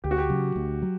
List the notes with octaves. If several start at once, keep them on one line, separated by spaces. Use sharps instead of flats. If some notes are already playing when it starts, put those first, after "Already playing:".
D2 G4
F#4
G4
C#3 F#3
D2
F#3